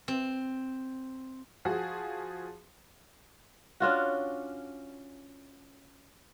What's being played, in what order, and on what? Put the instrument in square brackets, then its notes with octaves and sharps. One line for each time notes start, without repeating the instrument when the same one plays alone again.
[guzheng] C4
[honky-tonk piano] F3 F#4 G#4
[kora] C#4 D4 F4 F#4